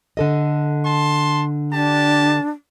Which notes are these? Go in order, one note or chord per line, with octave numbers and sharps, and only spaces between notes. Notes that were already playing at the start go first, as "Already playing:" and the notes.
D3 A4 D#5
A5 C6
D4 G4 A5